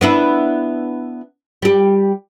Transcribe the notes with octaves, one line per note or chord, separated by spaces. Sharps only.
B3 D4 E4
G3 G4